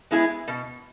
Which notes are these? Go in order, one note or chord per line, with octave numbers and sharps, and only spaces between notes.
G#3 B3 E4 G#4
B2